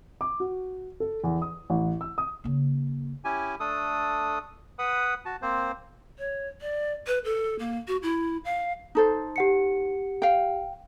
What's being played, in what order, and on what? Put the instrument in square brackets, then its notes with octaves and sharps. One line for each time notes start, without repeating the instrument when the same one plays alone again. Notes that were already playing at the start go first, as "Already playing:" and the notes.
[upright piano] D6
F#4
A4
E2
D#6
A1
E6
D#6
[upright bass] C#3 A#3
[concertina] C#4 E4 G4 G#5
A3 D4 A4 D#6
B4 F#5 B5 D#6
F#4 A5
A#3 C4 C5
[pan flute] C#5
D5
B4
A4
A#3
F#4
E4
F5
[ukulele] D#4 A4 C5
[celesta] G4 F#5 C#7
[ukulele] F5 G5